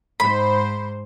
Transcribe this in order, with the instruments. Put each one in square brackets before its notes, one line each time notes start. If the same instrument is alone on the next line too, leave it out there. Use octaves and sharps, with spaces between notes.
[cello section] G#2 C5 [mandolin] B5